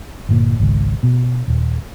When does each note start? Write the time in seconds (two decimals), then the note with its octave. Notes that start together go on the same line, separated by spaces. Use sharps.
0.29 G1 A#2
0.59 G#1 C#2
1.03 B2
1.48 D#1